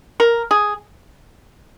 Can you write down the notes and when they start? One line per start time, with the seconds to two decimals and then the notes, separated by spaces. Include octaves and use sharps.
0.20 A#4
0.51 G#4